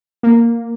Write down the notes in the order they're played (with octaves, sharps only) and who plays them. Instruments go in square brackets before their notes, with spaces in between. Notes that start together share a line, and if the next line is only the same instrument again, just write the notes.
[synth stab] A#3